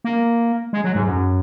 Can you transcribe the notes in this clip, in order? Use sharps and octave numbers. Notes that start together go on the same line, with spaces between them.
A#3
G#3
F#3
G#2
F#2